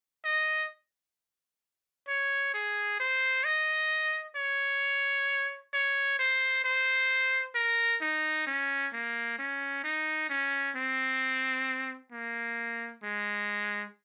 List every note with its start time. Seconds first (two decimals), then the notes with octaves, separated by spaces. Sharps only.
0.25 D#5
2.08 C#5
2.54 G#4
3.00 C5
3.44 D#5
4.36 C#5
5.74 C#5
6.19 C5
6.64 C5
7.55 A#4
8.01 D#4
8.47 C#4
8.93 A#3
9.39 C#4
9.84 D#4
10.30 C#4
10.76 C4
12.12 A#3
13.03 G#3